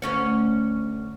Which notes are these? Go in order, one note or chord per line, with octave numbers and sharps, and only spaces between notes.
D2 C#4 C#5